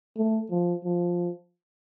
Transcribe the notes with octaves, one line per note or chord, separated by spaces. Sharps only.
A3
F3
F3